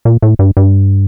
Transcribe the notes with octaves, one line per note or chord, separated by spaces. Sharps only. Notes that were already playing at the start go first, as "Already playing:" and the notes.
A#2
A2
G2
G2